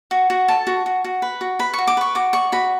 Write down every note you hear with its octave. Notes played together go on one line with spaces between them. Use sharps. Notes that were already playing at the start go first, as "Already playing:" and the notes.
F#4
F#4
A4 A5
F#4
F#4
F#4
B4
F#4
B4 B5
F#4 C#6
D6
B4 C#6
F#4 D6
D5 C#6
F#4 B5